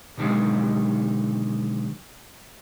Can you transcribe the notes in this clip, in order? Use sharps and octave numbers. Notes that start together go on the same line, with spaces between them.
B2 D3 D#3 F3 F#3 G#3